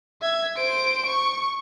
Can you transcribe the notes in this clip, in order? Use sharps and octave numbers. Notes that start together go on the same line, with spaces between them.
E5 G#6
C5 D7
C#6